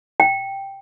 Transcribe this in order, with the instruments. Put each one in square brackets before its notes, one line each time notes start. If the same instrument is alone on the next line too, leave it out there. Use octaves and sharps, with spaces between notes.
[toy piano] G5